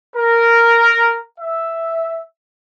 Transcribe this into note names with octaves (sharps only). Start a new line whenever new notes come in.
A#4
E5